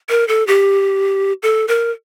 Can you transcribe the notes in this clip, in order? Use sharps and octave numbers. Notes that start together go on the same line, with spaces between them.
A#4
A4
G4
A4
A#4